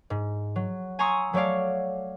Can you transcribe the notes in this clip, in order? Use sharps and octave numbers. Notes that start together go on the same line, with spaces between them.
G#2
F#3
G#5 A#5 C6 C#6 D#6 E6
F#3 A3 C#5 D5 F5